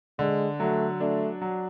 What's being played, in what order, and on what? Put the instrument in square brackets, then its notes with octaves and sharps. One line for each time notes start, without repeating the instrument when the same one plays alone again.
[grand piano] D3 [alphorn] G#3
[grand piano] F#3 [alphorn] A3
[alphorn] A3 [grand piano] D4
[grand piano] F#3